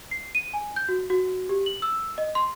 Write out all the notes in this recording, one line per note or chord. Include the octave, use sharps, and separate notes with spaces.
C7
D#7
G#5
G6
F#4
F#4
G4
F#7
E6
D#5
C6